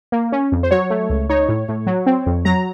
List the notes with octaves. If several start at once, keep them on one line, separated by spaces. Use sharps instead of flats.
A#3
C#4
F2
C5
F#3 C#5
A3
C#2
D#4 C#5
A2
A2
F#3
C4
F2
F#3 A#5